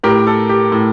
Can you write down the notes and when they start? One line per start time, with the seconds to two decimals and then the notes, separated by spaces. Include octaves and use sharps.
0.03 A2 G4 A#4
0.27 A4
0.49 G4
0.72 A2